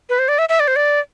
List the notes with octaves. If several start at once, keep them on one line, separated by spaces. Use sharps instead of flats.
B4
C5
D5
E5
E5
D5
C5
D5